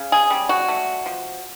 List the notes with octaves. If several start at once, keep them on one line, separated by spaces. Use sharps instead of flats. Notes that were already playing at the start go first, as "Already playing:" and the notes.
Already playing: C#3
G#4
G3
F#4
A3
F3